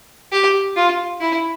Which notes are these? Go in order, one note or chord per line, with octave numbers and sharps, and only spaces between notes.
G4
F4
E4